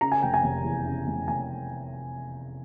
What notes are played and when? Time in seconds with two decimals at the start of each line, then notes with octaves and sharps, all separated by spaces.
0.01 C#3 A#5
0.12 G#5
0.23 F1 G5
0.34 G#5
0.44 F1
0.64 E2
0.85 C#3
1.07 F1
1.28 F1 G#5